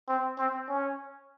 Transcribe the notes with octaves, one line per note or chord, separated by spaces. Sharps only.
C4
C4
C#4